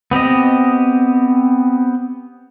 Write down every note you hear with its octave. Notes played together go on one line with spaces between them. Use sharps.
B3 C4 G4 D#5